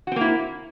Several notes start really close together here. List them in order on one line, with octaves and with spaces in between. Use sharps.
F#4 C4 A#3 E4